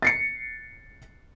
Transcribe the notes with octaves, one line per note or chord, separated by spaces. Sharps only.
A6 C7 C#7